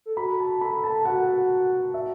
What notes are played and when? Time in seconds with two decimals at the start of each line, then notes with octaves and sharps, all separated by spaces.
0.06 A4
0.17 F#4 B5
0.40 A5
0.61 A4 B5
0.84 A5
1.05 F#4 F#5
1.94 F#4 E5